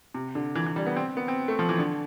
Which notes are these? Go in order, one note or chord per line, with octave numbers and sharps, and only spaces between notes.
C3
D3
E3
E3
G3
B3
C4
B3
C4
A3
F3
E3
D3